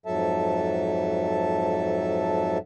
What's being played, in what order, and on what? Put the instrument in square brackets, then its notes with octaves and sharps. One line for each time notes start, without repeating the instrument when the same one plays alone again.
[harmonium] F2 G#2 F#3 A4 E5 A5